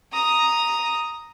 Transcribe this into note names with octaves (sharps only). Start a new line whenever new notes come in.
A#5 D#6